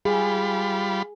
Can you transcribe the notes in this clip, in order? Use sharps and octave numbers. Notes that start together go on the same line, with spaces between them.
G3 F4 G#4 B5